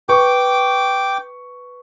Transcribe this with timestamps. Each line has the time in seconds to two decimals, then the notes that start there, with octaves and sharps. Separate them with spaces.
0.09 B4 G5 C#6 D6